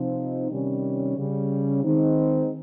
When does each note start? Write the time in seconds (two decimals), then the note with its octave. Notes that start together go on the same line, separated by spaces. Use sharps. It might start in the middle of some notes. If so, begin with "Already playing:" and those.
Already playing: C3 F3 C4 D#4
0.51 C3 D#3 G3 C#4
1.16 C#3 G3 C#4
1.83 D#3 G#3 C4 D#4